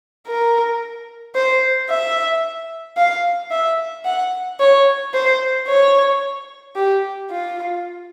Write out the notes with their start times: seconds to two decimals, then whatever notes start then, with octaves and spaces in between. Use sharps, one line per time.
0.27 A#4
1.35 C5
1.89 E5
2.97 F5
3.51 E5
4.05 F#5
4.60 C#5
5.14 C5
5.68 C#5
6.76 G4
7.30 F4